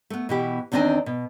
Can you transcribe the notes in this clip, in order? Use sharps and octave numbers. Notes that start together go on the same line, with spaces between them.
A3 B3
B2 E3 G4
E2 D#3 C4 D4 D#5 G#5
B2